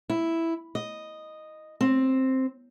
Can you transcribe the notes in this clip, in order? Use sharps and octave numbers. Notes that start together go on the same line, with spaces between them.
E4
D#5
C4